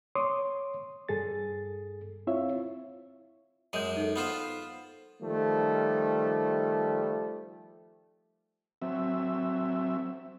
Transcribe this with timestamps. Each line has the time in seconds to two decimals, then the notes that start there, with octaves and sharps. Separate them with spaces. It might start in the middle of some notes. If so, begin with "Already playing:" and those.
0.15 C#5 C6 D6 D#6
1.09 G2 G#4 A4 A6
2.27 C4 E4 F4 C#5 E5 F5
3.73 F#2 G#3 G6 D#7
3.97 D#4 A4
4.16 B3 F4 C5
5.22 D#3 F3 G3 A3
8.82 F#3 C4 E5